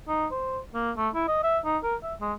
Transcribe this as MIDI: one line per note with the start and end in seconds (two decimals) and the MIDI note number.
0.08 0.26 63
0.32 0.59 72
0.74 0.92 58
0.97 1.09 57
1.14 1.26 64
1.28 1.38 75
1.44 1.59 76
1.65 1.78 63
1.84 1.96 70
2.03 2.14 76
2.21 2.33 56